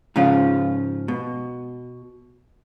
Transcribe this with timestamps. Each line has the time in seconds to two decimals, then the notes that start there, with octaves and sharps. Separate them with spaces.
0.16 G#2 C#3 F3 C#4 F4
1.08 B2